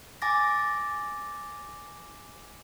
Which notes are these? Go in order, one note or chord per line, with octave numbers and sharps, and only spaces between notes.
G#5 D6 A6 A#6